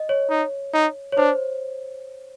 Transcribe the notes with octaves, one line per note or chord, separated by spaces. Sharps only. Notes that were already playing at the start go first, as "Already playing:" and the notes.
Already playing: D#5
C#5
D#4
D#4
C#5
D4 C5